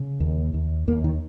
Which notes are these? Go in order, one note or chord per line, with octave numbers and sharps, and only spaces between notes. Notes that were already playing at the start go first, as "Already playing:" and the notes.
Already playing: C#3
D#2
D#2
D#2 A#3
D#3